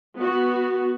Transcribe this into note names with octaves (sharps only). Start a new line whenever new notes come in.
B3 F#4